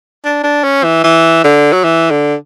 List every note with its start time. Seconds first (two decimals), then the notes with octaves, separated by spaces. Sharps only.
0.25 D4
0.43 D4
0.64 C#4
0.84 E3
1.04 E3
1.44 D3
1.73 F#3
1.84 E3
2.11 D3